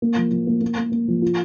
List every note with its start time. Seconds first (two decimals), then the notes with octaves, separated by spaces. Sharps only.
0.02 A#3
0.16 F3
0.31 F3
0.47 A#3
0.61 A#3
0.77 A#3
0.92 A#3
1.08 F3
1.22 F4